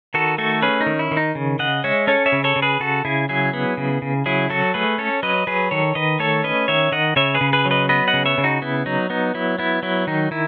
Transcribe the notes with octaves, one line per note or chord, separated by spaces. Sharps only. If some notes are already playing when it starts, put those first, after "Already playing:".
D#3 F#4 A4
A3 F#4 A4
C#4 G#4 B4
D#4
D#3
E4
D#3
D#4
C#3
C#3 D#5 F#5
G#3 C#5 E5
C#4 A4 C#5
C#5 E5
C#3
A4 C#5
C#3
G#4 B4
C#3 F#4 A4
C#3 E4 G#4
F#3 E4 G#4
B3
C#3
C#3
F#3 E4 G#4
F#3 F#4 A4
A3 G#4 B4
C#4 A4 C#5
F#3 B4 D#5
F#3 G#4 B4
D#3 A4 C#5
D#3 B4 D#5
A3 A4 C#5
C#4 B4 D#5
D#3 C#5 E5
D#3 D#5 F#5
C#3 C#5 E5
G#4 B4
C#3
G#4 B4
F#3
B4 D#5
B3 B4 D#5
D#5 F#5
C#3
C#5 E5
C#3
D#4 F#4
B3 E4
F#3 D#4
B3 D#4
F#3 E4
B3 E4
F#3 E4
D#3 D#4
D#3 E4